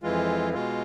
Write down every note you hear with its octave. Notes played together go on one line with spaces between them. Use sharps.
F2 E3 G#3 F4
B2 G#3 F4